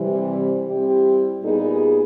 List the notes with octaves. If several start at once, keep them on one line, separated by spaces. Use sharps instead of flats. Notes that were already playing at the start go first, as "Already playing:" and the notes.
Already playing: C3 E3 G3
G3 C4 E4 G4
A#2 G3 B3 D#4 G#4